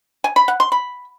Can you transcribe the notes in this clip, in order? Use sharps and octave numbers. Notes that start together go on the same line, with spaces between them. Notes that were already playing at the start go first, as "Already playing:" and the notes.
G#5
B5
F#5
C6
B5